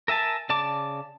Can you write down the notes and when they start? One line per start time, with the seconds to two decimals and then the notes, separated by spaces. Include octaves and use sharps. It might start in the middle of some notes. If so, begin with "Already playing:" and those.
0.08 A#4 E5 G#5 A5
0.49 C#3 D5 A5 D6